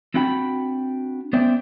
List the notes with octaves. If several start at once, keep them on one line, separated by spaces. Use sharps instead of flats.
C4 D4 E4 F#4 G5 B5
B3 C#4 C5 D5 E5 G5